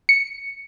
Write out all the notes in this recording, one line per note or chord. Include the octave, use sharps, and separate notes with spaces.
C#7